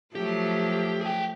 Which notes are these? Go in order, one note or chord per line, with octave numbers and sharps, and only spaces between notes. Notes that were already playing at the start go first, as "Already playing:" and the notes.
F3 F#3 A3 G4
G#4 G5